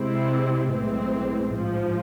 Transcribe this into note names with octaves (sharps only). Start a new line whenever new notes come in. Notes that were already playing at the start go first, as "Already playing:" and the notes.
Already playing: C3 G#3 C4 E4
B1 A2 E3 G#3 C4
A1 G#2 F3